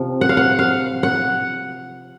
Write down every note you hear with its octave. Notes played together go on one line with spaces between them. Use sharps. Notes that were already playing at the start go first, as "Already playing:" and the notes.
Already playing: C3 F3
F#5
F5
F#5
F5
F#5